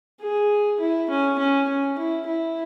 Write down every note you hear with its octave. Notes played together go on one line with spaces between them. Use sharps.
G#4
E4
C#4
C#4
C#4
E4
E4